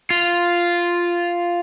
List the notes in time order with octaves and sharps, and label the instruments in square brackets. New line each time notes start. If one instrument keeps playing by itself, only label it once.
[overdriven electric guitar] F4